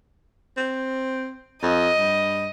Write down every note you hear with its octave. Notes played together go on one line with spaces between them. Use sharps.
C4
F2 D#5
G2